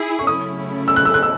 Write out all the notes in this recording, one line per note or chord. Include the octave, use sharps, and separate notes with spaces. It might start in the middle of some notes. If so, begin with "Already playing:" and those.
Already playing: E4 G#4
C#6
C#3 F#3 A3 C#4 E4 D#6
E6
F#6
E6
F#6
E6